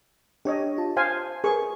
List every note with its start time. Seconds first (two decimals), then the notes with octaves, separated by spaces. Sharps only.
0.45 D4 G4 C#5 D#5
0.78 F4 A5
0.97 C5 F5 G#5
1.44 G#4 A#4 B4 C#6